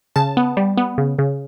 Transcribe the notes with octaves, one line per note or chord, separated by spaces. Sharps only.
C#3 A5
B3
G3
B3
C#3
C#3